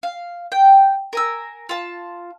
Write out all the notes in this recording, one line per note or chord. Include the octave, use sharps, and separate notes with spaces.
F5
G5
A#4 G#5 E6
F4 A5